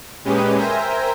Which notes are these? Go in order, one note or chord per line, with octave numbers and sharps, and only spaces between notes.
A#2 G#3 C#4 G4 B4 D#6
A#4 C5 E5 G5 G#5 A#5